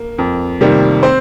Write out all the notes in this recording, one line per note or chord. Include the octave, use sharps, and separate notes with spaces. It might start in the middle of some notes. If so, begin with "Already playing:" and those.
Already playing: A#3
F2
C3 D#3 G3 A#3
C4 C5